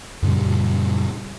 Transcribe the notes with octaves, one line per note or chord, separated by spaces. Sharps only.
F#2 A#2 C#3 G3